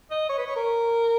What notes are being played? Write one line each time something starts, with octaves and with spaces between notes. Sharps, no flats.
D#5
C#5
B4
C#5
A#4